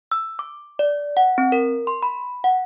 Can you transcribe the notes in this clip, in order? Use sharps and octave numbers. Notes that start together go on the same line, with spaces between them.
E6
D6
D5
F#5
C4
A#4
C6
B5
F#5